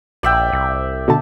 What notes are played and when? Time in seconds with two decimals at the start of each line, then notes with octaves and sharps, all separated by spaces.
0.23 A#1 D5 E5 G5
0.53 C2
1.08 B2 D3 A5